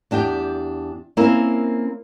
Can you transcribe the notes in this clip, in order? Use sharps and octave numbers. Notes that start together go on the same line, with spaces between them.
E2 D4 G4 G5
A#3 C4 C#4 E4 A#4